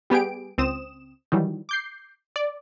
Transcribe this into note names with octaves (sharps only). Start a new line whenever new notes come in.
G3 B3 G4 G#4 D7
C#2 C4 D#6 E7
D#3 E3 F#3 G3
D6 G6 C7
D5